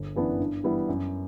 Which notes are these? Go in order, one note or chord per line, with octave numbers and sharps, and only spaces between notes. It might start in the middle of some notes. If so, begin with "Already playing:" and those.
Already playing: G1
F#2 E3 B3 D4
G2
E3 G3 B3 E4
F#2